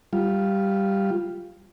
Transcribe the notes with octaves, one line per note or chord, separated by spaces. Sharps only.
G3 F4